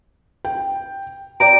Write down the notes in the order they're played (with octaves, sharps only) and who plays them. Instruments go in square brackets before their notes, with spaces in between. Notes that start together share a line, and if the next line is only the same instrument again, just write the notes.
[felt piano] G5
[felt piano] D5 G5 A#5 [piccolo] D7